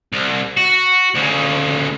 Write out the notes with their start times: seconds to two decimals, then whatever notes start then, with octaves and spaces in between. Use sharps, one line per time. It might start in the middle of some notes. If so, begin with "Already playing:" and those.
0.12 C2
0.57 F#4
1.15 D2 C#3